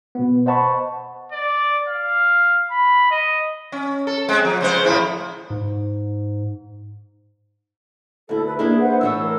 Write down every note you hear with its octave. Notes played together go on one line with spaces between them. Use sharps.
B2 B3
C5 D#5 F#5 A5 B5 C#6
D5
F5
B5
D#5
C#4
A4
G#3 C4
F3
C#3 G#3 C5
A2 F3 E4
G#2
D2 E4 A4
B4
A#3 D4 E4 G#4
B4 C5 F#5
A2 E3 C#5 E6
A#4